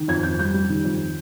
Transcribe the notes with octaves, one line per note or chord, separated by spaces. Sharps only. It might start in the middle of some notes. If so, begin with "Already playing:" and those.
Already playing: D#3
F2 G#6
F2 G6
G3 G6
G3
D#3
F2